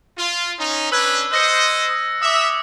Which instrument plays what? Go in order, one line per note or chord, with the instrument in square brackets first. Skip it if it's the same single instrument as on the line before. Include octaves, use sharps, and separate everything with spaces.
[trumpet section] F4
C#4 D#4
[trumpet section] C#4 D4 B4 [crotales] E6 F#6 G#6
[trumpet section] C5 D#5 [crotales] E6 A#6 C#7
[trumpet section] E5 [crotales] D6 D#6